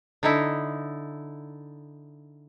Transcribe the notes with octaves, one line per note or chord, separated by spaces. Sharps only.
D3 D#4 E4